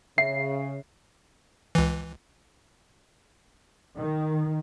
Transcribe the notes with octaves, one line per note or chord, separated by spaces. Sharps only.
C#3 E5 C7
C#2 E3
D#3